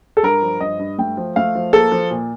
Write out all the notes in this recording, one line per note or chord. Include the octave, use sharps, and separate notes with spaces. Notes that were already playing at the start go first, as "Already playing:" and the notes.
A4
G2 A#4
F3
G2 D#5
G2
A3 G5
F3
A3 F5
F3
A#3 A4
F3
A#2